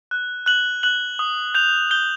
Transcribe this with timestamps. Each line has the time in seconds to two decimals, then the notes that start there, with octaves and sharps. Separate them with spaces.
0.11 F#6
0.46 F#6 F#7
0.83 F#6 F#7
1.19 D#6
1.55 G6 F7
1.91 G6 G7